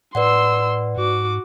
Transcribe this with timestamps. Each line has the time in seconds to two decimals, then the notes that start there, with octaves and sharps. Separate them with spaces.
0.15 A2 B4 D5 F#5 C6 E6
0.97 G#2 F#4 D6